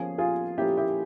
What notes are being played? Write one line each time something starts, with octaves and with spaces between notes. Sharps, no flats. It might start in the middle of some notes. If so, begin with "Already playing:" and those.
Already playing: F3 A#3 C#4 G#4
F4 G#4
F3 A#3 C#4 E4 G4
E4 G4